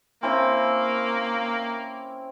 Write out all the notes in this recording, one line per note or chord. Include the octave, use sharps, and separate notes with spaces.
A#3 C4 C#4 E4